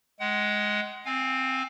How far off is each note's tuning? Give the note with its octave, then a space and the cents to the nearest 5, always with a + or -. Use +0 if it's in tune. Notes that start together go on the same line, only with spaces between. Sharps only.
G#3 +10 F#5 +35
C4 +0 F5 +15 G#5 -20